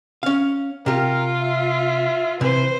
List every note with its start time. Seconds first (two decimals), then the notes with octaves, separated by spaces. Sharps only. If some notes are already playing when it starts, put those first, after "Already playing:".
0.23 C#4 F5
0.86 C3 F4 G4 A#4
1.41 E5
2.41 C3 E3 B4 C5